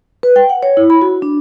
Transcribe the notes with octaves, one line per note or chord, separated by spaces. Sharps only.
B4
G5
F#5
C#5
E4
B5
F#4
D4